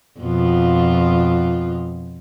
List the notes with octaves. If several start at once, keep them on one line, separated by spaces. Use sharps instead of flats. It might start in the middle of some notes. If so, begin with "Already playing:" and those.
F2 B2 F4